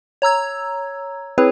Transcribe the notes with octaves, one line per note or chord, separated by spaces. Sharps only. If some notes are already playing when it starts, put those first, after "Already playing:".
C#5 A#5 E6 G#6
C4 E4 G#4 B4 C#5